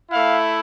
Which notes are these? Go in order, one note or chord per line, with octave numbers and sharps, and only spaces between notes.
A3 E4 F5